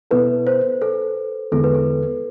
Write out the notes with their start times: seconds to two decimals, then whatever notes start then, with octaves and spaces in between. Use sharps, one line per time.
0.11 B2 B3 E4 A4 B4
0.47 C5
0.82 A4
1.52 E2 D3 G#3 B3 E4 A4
1.64 B4
1.75 A4